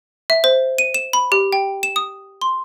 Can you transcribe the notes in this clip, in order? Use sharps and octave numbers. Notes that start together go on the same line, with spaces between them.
E5
C5
D#7
E7
B5
G4
G5
E7
D#6
C6